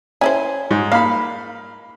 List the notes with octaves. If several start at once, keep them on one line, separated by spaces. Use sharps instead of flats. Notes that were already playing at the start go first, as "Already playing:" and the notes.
C#4 E4 C5 G#5
G#2
A#3 F5 B5